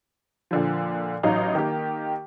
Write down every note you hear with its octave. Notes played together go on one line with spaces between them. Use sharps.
A#2 D3 F3
A1 F#3 D#4 F5
D#3 A#3 G4